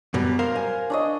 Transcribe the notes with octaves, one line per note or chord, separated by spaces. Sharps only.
F#2 B2 G3
A#4 C5 F5
G#5
D4 C#5 D#5